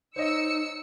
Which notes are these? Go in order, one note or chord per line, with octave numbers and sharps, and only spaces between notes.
D#4 C5 C#5 D#5 E6 C#7